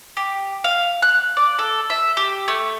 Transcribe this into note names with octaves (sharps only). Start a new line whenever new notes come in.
G4
F5
F#6
D5
A4
E5
G4
A3